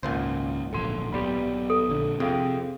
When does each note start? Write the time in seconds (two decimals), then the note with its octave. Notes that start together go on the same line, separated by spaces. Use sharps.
0.03 G#1 C#2 A#2 C5
0.73 D1 A#1 A4 C6
1.13 B1 G4 D5 B5
1.70 A4
1.89 A#1 D3
2.20 F2 C3 C4 G#4 F5 G5